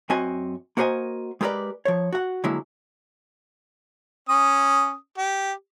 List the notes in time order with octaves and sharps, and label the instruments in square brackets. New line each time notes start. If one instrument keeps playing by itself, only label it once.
[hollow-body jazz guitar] F#2 C4 F#4 D#5 G#5
A#3 F#4 A#4 C5 D#5 G#5
G#3 G4 A#4 B4 D5
F3 C#5
F#4 F#5
D3 F#3 G#3 A#3 E4
[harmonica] C#4 D#6
G4